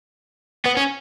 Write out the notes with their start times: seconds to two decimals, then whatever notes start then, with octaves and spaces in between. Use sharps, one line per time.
0.65 B3
0.77 C#4